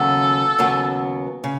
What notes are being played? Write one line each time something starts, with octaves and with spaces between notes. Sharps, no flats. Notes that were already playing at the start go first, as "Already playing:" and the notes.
Already playing: D#2 C#3 F#3 B3 A4
D#2 C#3 F#3 B3
C#3